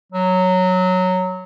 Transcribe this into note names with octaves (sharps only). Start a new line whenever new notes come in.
F#3